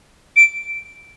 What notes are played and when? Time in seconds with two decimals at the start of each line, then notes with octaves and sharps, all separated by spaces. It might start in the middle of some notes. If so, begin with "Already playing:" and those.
0.36 D7